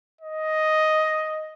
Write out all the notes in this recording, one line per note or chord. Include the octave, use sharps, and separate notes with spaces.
D#5